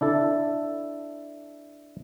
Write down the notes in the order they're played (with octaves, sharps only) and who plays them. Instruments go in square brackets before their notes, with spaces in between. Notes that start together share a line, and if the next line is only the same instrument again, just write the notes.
[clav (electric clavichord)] D4 E4 A4